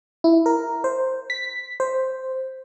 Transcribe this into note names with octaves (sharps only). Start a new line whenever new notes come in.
E4
A#4
C5
B6
C5